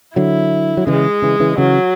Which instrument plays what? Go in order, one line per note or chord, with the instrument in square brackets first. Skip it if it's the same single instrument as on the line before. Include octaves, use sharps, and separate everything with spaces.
[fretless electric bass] D3 F#3 [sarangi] E4
[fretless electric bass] F#3
[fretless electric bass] C#3 E3 [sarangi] G#3
[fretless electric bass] C#3 E3
C#3 E3
[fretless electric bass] C#3 E3 [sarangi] F#3